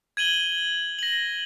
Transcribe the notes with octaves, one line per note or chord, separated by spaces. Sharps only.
G#6 D#7 F#7 G7
A#6 F#7